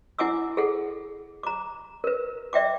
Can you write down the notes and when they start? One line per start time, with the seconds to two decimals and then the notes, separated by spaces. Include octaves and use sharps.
0.19 E4 F#5 G#5 D6 E6
0.57 G#4 A4 F#5
1.43 A#5 D6
2.04 A#4 B4
2.53 D5 E5 G5 D6